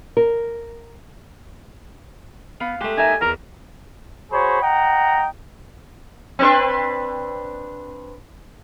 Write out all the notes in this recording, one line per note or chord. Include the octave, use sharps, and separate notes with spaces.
A#4
B3 F5
G#3 A3 G4
D#4 A#4 E5 G#5
E2 A#4 A#5
F#4 G#4 C5 C#5 B5
D#5 F#5 G5 A#5
C4 D4 B4